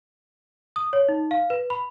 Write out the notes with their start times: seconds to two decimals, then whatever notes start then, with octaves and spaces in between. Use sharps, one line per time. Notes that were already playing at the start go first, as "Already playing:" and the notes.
0.76 D#6
0.93 C#5
1.09 D#4
1.31 F5
1.50 B4
1.70 B5